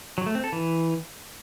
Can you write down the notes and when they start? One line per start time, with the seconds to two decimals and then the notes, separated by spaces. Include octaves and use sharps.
0.18 F#3
0.26 A3
0.35 C4
0.44 A4
0.52 E3